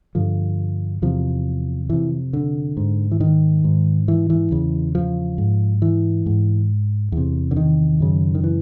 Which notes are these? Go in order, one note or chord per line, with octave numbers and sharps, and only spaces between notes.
G2 D3 F3
E2 C3 F3
F2 C3 E3
D3
G#2
E3
D#3
G#2
E3
E3
E2 C#3
F3
G#2
E3
G#2
E2 C3
D3
D#3
F#2 C#3
D#3
E3